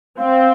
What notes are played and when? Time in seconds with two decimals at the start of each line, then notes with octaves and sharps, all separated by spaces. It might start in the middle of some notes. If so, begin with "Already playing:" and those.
0.18 C4 F5